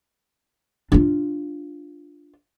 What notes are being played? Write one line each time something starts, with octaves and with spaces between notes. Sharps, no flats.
D4 F4